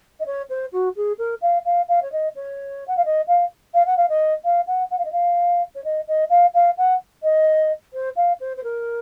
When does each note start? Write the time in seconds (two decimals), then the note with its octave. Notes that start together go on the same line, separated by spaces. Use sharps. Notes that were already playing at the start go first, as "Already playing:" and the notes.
0.20 D#5
0.26 C#5
0.49 C5
0.72 F#4
0.96 G#4
1.18 A#4
1.42 F5
1.65 F5
1.88 F5
2.02 C#5
2.12 D#5
2.35 C#5
2.87 F#5
2.97 F5
3.05 D#5
3.27 F5
3.74 F5
3.86 F#5
3.97 F5
4.09 D#5
4.44 F5
4.67 F#5
4.91 F#5
4.98 F5
5.05 D#5
5.12 F5
5.75 C#5
5.84 D#5
6.08 D#5
6.30 F5
6.54 F5
6.77 F#5
7.23 D#5
7.93 C5
8.16 F5
8.40 C5
8.57 C5
8.63 A#4